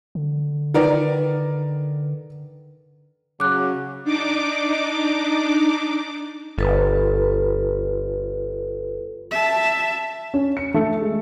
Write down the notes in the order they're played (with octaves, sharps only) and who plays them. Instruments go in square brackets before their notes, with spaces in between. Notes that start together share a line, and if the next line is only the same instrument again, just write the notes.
[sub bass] D3
[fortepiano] D#3 A#4 D5 [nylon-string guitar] B4 F#5
[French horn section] C#3 F#3 [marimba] D6 F#6
[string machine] D4 D#4 D6
[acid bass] G1 [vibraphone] F4 A4 B4
[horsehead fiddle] E5 A5
[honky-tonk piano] C#4
C#7
A3
G#3